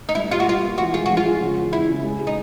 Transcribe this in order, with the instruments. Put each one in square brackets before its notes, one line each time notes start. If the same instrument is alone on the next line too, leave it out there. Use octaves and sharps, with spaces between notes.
[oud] D#4
[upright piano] G2 [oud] E4
[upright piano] G3 [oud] F4
[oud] F#4
[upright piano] G3 [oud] F4
[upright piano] A#3
[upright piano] E3 [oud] F#4
[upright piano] G#3 [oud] F4
[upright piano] A#1 [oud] F#4
[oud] F4
[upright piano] G#3
C#3
E2
[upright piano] E2 [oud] E4
[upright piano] C#3
G#3
G#3
[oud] D#4